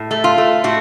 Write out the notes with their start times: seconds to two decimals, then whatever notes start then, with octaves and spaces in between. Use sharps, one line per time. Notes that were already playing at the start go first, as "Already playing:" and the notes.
Already playing: A2
0.11 A3
0.24 F4
0.38 A3
0.64 A2 F#4